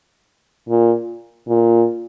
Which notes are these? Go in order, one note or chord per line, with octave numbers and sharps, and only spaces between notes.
A#2
A#2